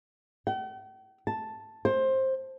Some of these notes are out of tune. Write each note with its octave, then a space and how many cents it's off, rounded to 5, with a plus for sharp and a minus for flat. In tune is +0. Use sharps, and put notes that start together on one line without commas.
G5 -45
A5 +0
C5 +15